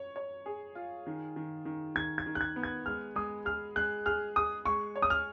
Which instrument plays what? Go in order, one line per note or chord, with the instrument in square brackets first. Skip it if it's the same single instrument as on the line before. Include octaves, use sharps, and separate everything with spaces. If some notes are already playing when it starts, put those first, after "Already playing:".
Already playing: [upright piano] C#5
C#5
G#4
F4
D#3
D#3
D#3
[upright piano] D#3 [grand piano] G#6
[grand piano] G#6
[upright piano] D#3
[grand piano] F#6
G#6
[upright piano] B3
[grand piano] G#6
[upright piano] G#3 [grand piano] F6
[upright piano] G#3 [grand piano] D#6
[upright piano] G#4 [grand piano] F6
[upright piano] G#3 [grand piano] F#6
[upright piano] G#4 [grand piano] F6
[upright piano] G#4 [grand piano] D#6
[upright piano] G#3 [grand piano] C#6
[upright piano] C#5
[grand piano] D#6
F6